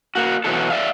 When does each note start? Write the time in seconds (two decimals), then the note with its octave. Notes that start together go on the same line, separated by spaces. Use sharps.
0.15 A#3 F#4
0.44 B2 E3 F#3 F#4 A4
0.70 D5 E5 F5